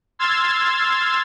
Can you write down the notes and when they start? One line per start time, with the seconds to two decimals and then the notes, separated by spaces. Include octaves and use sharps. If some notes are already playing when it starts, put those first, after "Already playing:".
0.19 C6 E6 F6 G#6 A6